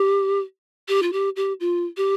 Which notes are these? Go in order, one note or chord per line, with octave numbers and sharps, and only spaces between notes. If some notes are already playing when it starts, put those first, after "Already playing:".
Already playing: G4
G4
F4
G4
G4
F4
G4